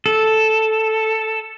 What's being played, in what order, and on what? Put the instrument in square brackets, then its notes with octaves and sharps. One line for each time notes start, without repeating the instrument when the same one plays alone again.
[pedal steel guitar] A4